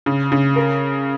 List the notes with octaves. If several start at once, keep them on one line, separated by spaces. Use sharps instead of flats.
C#3
C#3
A#4